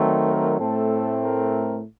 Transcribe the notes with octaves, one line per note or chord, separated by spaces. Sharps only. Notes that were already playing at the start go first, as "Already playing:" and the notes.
Already playing: D#3 F#3 A3 C4
A#4
A2 A3 C4 A4
A#4